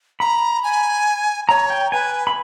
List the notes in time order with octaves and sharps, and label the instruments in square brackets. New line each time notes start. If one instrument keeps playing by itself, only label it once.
[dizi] A#5 [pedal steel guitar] B5
[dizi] G#5
[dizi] C#5 [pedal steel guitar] A#5
[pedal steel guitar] G5
[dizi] B4 [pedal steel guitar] G#5
[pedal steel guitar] B5